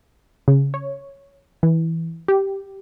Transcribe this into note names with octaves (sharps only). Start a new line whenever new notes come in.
C#3
C#5
E3
G4